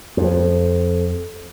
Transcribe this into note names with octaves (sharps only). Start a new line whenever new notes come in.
F2